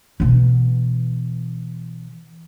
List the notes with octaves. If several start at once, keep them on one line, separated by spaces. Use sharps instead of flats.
B2 E3